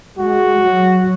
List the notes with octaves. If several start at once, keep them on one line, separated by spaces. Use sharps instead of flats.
G#3 F#4
F#3